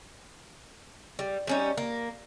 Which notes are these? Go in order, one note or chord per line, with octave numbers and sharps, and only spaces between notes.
G3
G3 C#4 D#4
A#3